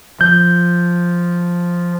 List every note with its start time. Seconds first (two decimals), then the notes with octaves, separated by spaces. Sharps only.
0.21 F3 G6